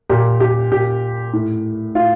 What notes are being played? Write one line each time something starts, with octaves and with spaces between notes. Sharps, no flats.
A#2 G4
G4
A#2 G4
A2
A2 F4